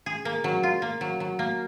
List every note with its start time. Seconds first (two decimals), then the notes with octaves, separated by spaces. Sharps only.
0.06 G#4
0.25 A#3
0.44 F#3
0.63 F4
0.82 A#3
1.01 F#3
1.20 F#3
1.39 A#3